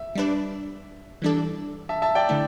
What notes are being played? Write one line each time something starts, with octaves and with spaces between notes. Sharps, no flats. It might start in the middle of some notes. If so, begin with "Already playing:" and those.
Already playing: E5
G3 D4 B4 D5
E3 G3 D4 A4 D5
E5 A5
E5 A5
D5 G5
D3 A3 E4